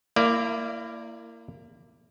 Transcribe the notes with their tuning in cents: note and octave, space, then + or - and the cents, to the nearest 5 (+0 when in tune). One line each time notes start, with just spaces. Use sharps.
A#3 -15 E4 +20 D5 +0